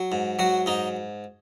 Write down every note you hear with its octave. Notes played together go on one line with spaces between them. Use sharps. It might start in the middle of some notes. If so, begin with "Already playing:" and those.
Already playing: F#3
G#2
F#3 F#4
G#2 D#4